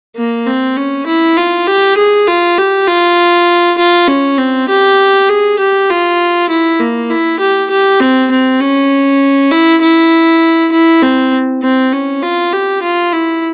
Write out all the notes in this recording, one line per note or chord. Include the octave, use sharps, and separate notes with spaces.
A#3
C4
C#4
E4
F4
G4
G#4
F4
G4
F4
F4
C#4
C4
G4
G#4
G4
F4
E4
A#3
E4
G4
G4
C4
C4
C#4
E4
E4
E4
C4
C4
C#4
F4
G4
F4
E4